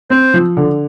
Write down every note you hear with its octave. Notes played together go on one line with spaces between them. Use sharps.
C4 C5
F3
D3